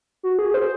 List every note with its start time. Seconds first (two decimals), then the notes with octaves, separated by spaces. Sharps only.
0.23 F#4
0.39 G#4
0.54 C5